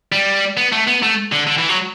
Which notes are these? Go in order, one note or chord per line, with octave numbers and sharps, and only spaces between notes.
G3
B3
A3
B3
A3
D3
D3
E3
F#3